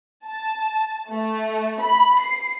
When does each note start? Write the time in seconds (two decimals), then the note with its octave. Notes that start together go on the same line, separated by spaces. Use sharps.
0.25 A5
1.11 A3
1.81 B5
2.22 C7